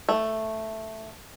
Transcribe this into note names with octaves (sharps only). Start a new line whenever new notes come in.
A3